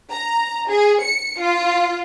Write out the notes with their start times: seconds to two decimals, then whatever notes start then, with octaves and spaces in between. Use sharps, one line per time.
0.10 A#5
0.68 G#4
1.00 C#7
1.39 F4